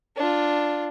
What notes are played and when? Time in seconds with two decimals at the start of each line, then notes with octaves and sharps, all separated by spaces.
0.17 D4 F4